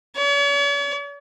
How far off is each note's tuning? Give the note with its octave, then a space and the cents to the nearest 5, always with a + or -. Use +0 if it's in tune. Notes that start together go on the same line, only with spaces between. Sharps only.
C#5 +45